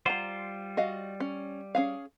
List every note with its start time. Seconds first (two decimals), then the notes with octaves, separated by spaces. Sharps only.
0.06 G3 F4 C5 F#5 A#5
0.77 F#4 D#5 F5
1.20 C#4
1.75 C#4 G#4 F5